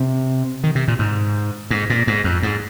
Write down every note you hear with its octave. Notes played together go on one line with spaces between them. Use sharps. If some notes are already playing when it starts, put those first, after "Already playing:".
Already playing: C3
D#3
C3
A#2
G#2
G#2
A#2
G#2
F2
G#2